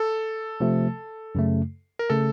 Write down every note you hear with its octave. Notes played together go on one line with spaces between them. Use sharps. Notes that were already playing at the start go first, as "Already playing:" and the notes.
Already playing: A4
C3 F3 A3
F#2 C#3 A3
A#4
C#3 A3 A4